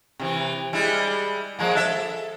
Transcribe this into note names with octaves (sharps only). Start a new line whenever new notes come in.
C3 E3
G3 G#3 E4
F3 G#3 A#3
A4 E5